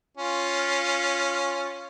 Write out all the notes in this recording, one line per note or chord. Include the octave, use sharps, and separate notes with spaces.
C#4 F4